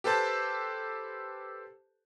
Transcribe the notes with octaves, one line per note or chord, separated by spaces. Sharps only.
G4 A4 B4 C5 A5